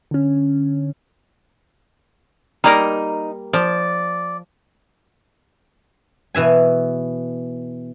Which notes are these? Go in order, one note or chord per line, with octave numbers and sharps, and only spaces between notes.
D3 C#4
G3 A#3 D#4 A#4
F3 D5
B2 E3 E5 G#5